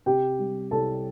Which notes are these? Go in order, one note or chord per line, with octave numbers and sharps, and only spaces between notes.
C3 G4 G5
G3
C2 A4 A5